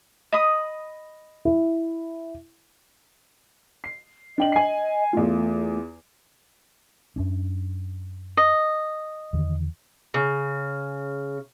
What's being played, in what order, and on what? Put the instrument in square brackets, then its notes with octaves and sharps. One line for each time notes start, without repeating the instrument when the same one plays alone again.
[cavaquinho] D#5 B5 D#6
[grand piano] E4
[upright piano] C7
[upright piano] D4 G5 F#7 [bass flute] D#5
[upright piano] G#5 C7
[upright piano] E2 F4 [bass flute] A3
[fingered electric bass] F#2 C#4 D4
[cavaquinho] D#5
[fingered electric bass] E2 D3 D#3
[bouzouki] C#3